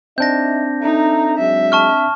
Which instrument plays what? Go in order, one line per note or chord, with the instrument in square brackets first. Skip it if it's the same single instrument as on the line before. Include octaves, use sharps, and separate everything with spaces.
[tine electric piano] C4 D4 [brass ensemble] D#4 D#5 E5 [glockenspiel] G6 A#6
[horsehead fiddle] D#4 [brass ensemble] A4 E5 A#5
[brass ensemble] F#3 G#3 [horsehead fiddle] E5
[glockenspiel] A5 C#6 F6